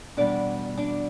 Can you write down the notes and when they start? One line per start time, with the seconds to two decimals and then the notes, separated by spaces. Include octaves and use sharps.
0.17 E2 B2 G3 D4 D5
0.77 D4 D5